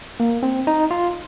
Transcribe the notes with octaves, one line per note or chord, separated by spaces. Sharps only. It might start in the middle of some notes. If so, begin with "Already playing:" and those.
A#3
C4
D#4
F4